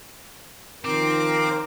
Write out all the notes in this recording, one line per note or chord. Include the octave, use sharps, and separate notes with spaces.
D#3 F3 C4 A#4 D6